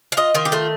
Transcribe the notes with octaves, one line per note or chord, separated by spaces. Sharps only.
F5
F4 D#5
D#3 F4
G4
A3 F4